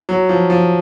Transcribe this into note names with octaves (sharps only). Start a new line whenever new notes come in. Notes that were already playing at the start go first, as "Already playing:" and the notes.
F#3
F3
F3